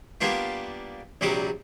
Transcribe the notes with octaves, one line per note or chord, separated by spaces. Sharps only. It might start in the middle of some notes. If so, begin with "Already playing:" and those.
G3 A#3 B3 D4 F4
A#1 C3 F#3 G3 D6 D#6